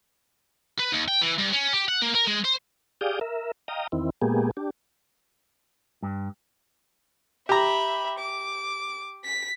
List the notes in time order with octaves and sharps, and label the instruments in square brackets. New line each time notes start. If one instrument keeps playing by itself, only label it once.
[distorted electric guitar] B4
D#2
G5
E3
G2
C#4
G4
F#5
A#3
A#4
G#3
C5
[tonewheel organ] G4 G#4 D5 F5 D#6 G6
A#4 E5
D#5 F5 G5 A#5 D#6
E2 D#3 C4 E4
A#2 G#3 A#3 B3 G4 G#4
D4 G4
[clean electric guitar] G2
[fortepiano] G4 A#5 [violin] E5 B5
[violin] D6
B6